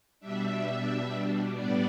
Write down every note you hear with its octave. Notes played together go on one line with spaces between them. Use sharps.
B2 G3 D4 E5
A2 G3 B3 D4 D5